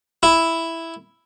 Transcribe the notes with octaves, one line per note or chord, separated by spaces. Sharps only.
E4